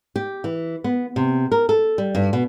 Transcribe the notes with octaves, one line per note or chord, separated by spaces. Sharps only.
G4
E3
B3
C3
A#4
A4
G3
G2
B2